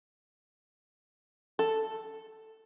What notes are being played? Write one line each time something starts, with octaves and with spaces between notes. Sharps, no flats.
A4